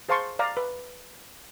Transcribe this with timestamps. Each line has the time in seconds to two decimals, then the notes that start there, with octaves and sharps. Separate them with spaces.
0.09 G#4 C5 F5 A5 C6 C#6
0.39 D5 F5 A#5
0.57 B4